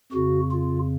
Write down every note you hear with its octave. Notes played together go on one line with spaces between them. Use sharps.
F2 C#3 F#4
F4